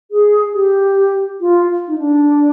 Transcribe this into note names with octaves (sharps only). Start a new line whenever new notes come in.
G#4
G4
F4
D#4
D4